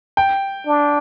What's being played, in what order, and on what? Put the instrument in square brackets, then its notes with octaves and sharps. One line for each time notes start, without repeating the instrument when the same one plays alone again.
[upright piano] G5
[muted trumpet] D4